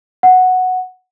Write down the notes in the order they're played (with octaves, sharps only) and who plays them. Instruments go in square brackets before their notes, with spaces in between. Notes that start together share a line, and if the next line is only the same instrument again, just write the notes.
[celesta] F#5